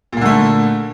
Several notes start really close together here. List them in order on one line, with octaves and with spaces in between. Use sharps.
A#2 A#3 D3 A3